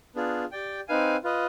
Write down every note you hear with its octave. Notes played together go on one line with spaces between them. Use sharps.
B3 D4 F4 G#4
G4 D5 G5
C4 D#4 B4 F5 G#5
F4 B4 D#5